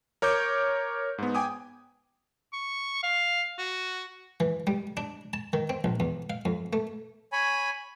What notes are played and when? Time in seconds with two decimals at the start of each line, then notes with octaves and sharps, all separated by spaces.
0.22 A#4 C#5 D6 G6
1.18 G#2 B3
1.35 G5 G#5 D6 D#6
2.53 C#6
3.03 F5
3.58 F#4
4.40 E3
4.67 G3
4.97 D4
5.33 A5
5.53 D#3
5.70 C4
5.84 A#1
6.00 E2
6.30 F5
6.45 F2
6.73 A3
7.32 C#5 G#5 B5